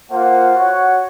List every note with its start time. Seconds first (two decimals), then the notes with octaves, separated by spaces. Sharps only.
0.11 A#3 F4 C5 F#5
0.54 F#4 C#5 F#5